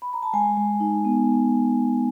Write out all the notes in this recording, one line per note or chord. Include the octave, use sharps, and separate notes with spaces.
B5
A#5
A5
G#3 G#5
G#3
D#4
B3